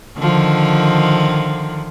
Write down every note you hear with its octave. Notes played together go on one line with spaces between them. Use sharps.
D3 D#3 F3